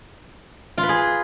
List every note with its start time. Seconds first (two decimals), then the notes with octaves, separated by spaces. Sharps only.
0.78 F4
0.83 B4
0.89 G#4